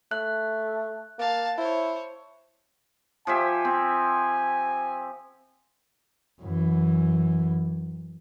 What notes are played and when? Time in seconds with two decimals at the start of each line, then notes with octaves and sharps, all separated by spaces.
0.11 A3 F#6
1.19 A#3 F5 A5
1.58 E4 C5 C#5
3.27 F3 G4 E5 G#5
3.65 C4
6.41 F#2 E3